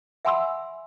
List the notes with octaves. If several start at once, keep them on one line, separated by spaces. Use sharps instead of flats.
E5 F#5 G#5 B5 C6 E6